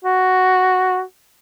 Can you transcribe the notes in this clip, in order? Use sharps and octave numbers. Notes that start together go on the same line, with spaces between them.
F#4